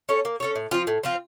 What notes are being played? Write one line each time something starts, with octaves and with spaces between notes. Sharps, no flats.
C#4 A4 C#5
A#3
C#4 A4 C#5
A2
F3 C4 F4
A2
F3 C4 F4